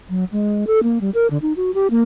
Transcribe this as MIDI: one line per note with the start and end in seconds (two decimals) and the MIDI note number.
0.10 0.24 54
0.32 0.64 56
0.67 0.82 69
0.83 0.98 58
1.01 1.10 55
1.14 1.27 70
1.30 1.38 50
1.42 1.53 63
1.56 1.71 66
1.74 1.87 67
1.91 2.03 58